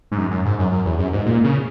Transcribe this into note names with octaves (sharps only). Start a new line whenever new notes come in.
G#2
F#2
F#2
G#2
F#2
F#2
E2
F#2
G#2
A#2
C#3